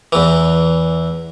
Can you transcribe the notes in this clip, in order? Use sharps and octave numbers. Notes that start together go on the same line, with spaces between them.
E2 E3